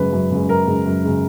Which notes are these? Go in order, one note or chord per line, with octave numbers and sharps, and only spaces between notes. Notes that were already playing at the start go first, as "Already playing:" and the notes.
Already playing: F#2 C#3 G#3 B4
F#2
C#3 G#3
F#2 A#4
C#3 G#3
F#2
C#3 G#3